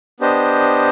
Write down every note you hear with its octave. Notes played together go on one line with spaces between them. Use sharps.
B3 D4 G4 C5 D#5